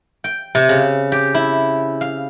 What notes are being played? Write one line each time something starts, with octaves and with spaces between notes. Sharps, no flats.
G5
C3
C#3
G4
E4
F5